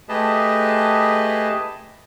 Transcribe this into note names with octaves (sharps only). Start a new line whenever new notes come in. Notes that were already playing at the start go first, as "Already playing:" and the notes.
A3 G4 G#4 B4 D#5 A5